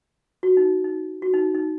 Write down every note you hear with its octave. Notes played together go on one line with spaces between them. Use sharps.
F#4
D#4
D#4
F#4
D#4
D#4